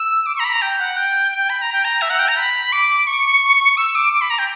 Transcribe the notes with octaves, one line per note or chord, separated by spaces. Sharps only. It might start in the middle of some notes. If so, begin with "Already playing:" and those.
Already playing: E6
D6
C#6
A#5
B5
A#5
G5
F#5
G5
G5
B5
A#5
G5
A#5
E5
F#5
G5
A#5
B5
D6
C#6
E6
D6
D6
B5
A#5
G5